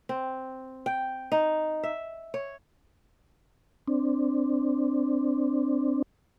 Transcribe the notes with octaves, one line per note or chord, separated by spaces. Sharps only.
C4
G5
D#4
E5
C#5
C4 D4